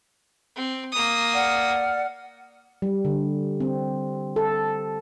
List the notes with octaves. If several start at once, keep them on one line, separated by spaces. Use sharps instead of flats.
C4
A#3 D#6
D5 F#5 F6
G3
D3
C4
A4